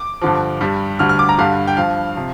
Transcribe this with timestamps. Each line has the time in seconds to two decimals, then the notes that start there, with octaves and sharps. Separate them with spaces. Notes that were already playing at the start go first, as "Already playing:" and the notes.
Already playing: D6
0.22 G2 D3 F3
0.61 G2 G3
0.99 D2 D3 G3 F6
1.09 F6
1.19 D6
1.29 A#5
1.38 G2 D3 G3 F5
1.67 G5
1.77 G2 F3 F5
2.16 C3 F3